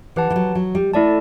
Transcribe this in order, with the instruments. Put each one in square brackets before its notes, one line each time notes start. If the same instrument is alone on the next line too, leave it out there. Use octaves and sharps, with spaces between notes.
[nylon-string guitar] E3 [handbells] G4 B4 F#5 A5
[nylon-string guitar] E3
F#3
F#3
G3
[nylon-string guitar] A3 [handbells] E4 A4 D5 A5